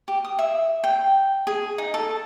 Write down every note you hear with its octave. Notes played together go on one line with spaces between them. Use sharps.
G4
D#6
E5
G5
G#4
D#4
A4